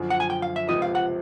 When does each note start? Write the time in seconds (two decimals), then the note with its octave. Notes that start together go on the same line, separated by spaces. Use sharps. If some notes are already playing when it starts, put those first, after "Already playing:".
Already playing: F#2 D3 F3
0.10 F#5
0.20 G#5
0.30 G5
0.42 F5
0.56 E5
0.69 C#2 C3 F3 D#5
0.82 F5
0.95 F#5